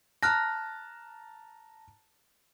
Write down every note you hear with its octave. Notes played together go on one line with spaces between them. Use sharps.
A5 A#5 F6 F#6 A#6